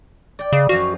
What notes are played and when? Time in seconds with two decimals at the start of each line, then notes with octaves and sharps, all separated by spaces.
0.39 D5 G5
0.53 C#3 D#5
0.69 F#2 F3 F#4 F5